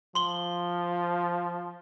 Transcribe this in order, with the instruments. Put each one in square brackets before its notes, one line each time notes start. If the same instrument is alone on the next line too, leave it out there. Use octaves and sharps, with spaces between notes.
[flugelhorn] F3 [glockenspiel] C6 G7